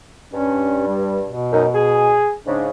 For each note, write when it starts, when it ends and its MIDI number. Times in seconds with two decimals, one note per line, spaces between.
0.34 1.31 43
0.34 0.83 61
0.87 1.18 55
1.25 2.26 47
1.51 1.65 42
1.51 1.65 63
1.74 2.34 68
2.47 2.69 44
2.47 2.69 49
2.47 2.64 62